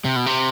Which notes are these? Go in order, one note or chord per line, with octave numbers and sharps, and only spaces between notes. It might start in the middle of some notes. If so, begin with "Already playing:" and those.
C3
B2
C3